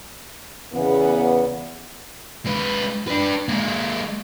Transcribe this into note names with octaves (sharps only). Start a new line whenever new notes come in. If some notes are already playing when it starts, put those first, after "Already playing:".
E2 C#3 B3
G#3 B4
D4 B4
G#3 A#3